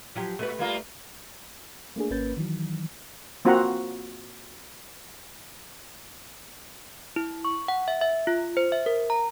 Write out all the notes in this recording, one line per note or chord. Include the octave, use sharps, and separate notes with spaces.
F3 F#3 G4
A#2 A3 B4
G3 A#3 F4
A3 A#3 D4 G#4
G#1 A#3 C#4 B4 G6 A6
D#3 E3 F#3
A#3 C4 F4 F#4 F#5 A#5
E4
C#6
F#5
E5
E5
F4
C5
E5
A#4
A#5